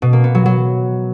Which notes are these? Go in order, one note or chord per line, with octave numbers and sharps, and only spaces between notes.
B2
A#3
B3
F#3
F#3